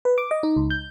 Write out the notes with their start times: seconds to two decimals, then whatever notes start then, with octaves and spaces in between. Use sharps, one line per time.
0.05 B4
0.18 D6
0.31 D#5
0.43 D#4
0.57 C#2
0.70 G6